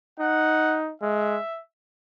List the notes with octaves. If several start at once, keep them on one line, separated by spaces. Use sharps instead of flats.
D#4 F#5
G#3 E5